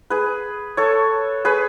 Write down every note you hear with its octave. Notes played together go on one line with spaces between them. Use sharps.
G#4 B4
A4 C#5
G#4 B4